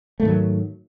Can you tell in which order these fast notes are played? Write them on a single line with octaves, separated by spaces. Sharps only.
A3 G#2 D#3 F#3